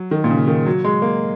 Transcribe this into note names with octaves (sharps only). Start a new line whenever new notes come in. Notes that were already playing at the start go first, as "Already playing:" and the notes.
Already playing: F#3
D#3
A#2
C#3
D#3
F#3
G#3
A#3